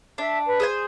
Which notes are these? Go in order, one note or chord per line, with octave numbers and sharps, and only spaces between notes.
D4 E5
B4
G#4 C5 G#5